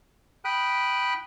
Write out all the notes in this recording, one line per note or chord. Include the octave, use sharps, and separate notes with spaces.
G5 B5 D#6 F#6